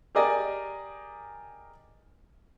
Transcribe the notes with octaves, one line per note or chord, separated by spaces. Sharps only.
G4 G#4 A#4 D5 D#5 G#5